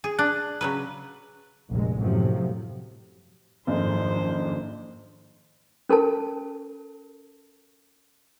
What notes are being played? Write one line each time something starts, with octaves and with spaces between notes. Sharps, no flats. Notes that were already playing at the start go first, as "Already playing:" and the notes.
G#4
D4 F#6
C#3 F#3 B4
F1 A#1 A#2 G#3
F#2 A2 C3 F3 F#3
F#1 F2 G#2 D#3 F3 D4 C5
C#4 A4 A#4 A5